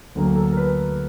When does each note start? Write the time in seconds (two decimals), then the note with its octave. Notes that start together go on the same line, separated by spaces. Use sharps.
0.15 D2 D3 F#3 A#3
0.36 A4
0.52 A#4
0.57 B4